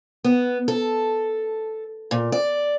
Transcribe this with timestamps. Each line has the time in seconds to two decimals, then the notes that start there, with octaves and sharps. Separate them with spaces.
0.24 B3
0.68 A4
2.11 A#2
2.32 D5